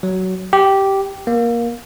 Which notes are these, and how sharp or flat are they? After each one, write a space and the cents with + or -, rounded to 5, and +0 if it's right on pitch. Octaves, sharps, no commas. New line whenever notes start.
F#3 +15
G4 -10
A#3 +15